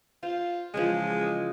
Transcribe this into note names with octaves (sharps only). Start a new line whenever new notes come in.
F4 C5
C#3 E3 F3 G#3